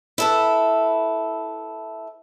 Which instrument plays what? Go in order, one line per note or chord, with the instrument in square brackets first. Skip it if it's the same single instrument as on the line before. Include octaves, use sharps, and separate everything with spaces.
[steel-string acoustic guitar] E4 A4 B4